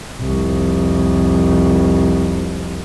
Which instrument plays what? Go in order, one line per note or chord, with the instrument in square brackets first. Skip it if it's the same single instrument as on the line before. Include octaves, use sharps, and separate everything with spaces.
[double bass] C2 F2